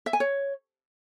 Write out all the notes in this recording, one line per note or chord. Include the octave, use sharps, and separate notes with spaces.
E5
G#5
C#5